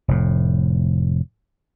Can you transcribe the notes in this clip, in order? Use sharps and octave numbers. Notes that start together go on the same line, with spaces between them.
F1 A2